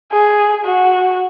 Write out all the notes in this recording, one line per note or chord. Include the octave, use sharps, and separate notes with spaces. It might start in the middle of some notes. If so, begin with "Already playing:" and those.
G#4
F#4